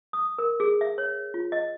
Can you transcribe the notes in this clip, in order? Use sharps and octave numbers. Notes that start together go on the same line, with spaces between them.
D#6
A#4
G#4
E5
C#5
F4
D#5